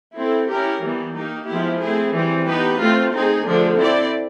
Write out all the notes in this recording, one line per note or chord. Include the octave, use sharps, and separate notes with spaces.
C4 E4 A4
C#4 E4 G4 A#4
E3 G3 B3
A#3 D#4 G4
F3 G#3 B3 E4 G4
A3 C4 E4 G#4
E3 G3 C4
B3 D#4 G4 B4
A3 C4 F4
C4 D#4 G#4
D3 F3 A3 D4
C4 E4 A4 D5